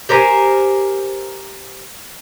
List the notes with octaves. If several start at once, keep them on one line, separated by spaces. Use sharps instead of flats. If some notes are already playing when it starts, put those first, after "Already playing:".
G4 A#4 C5 G#5